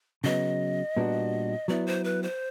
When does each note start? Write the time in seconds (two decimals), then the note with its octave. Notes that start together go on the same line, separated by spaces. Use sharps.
0.24 C#3 F#3 B3 D#5
0.97 A#2 G3 B3 D4 F#4
1.68 F#3 B3 E4 D5
1.87 C5
2.04 B4
2.23 C5